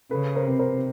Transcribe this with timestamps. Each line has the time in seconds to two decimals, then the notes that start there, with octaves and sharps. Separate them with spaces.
0.11 C#3 A4 B4
0.35 A#4 C5
0.47 C3 B4
0.59 A#4 C5